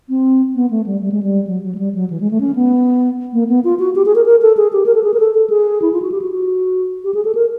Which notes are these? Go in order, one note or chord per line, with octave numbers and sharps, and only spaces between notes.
C4
B3
A3
G3
G3
G#3
G3
F#3
F#3
G#3
G3
F#3
E3
G#3
A3
C#4
B3
A#3
B3
F4
F#4
G4
G#4
A#4
A#4
A4
G#4
G4
A#4
A4
G#4
A#4
A4
A4
G#4
E4
F4
F#4
G4
F#4
F#4
G4
G#4
A4
A#4